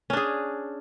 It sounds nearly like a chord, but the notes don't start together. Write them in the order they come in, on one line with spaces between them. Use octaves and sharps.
C#4 D4 G#4